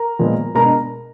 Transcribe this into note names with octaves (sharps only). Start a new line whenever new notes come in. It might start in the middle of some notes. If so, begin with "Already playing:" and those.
Already playing: A#4 A#5
A#2 F3 G#3 B3
B2 G#3 B3 D4 A#4 A#5